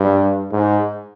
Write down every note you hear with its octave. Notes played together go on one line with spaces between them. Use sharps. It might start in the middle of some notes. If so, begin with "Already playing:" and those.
Already playing: G2
G#2